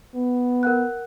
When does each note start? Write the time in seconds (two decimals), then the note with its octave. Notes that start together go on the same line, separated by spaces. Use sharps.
0.15 B3
0.63 A#4 F#5 F#6